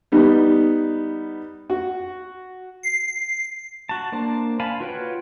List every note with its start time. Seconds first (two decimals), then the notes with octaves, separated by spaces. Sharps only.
0.12 G3 B3 D#4
1.70 F#4
2.83 C7
3.89 F#4 A5
4.12 A#3 D4 C5 A5
4.60 F5 G#5 A5 B5
4.80 F4 F#4 B4 C#5 G5